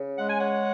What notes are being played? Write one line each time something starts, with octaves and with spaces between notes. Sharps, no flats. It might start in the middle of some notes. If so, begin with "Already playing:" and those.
Already playing: C#3
G#3 F#5
G#5
C#5 F#5